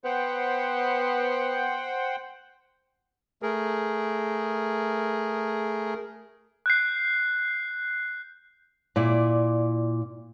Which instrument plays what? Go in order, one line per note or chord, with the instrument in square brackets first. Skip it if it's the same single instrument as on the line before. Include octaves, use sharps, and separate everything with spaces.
[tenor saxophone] B3 [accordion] C5 F#5 G5
[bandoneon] A3 G#4 A#4
[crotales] F#6 G6 C7
[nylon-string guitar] A#2 E4 D5